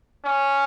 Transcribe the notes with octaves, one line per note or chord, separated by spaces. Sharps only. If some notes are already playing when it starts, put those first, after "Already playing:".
C#4